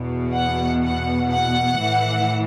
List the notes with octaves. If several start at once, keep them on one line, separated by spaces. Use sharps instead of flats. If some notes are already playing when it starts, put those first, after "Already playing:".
Already playing: E2 B2
F#5
F#5
F#5
A2 E3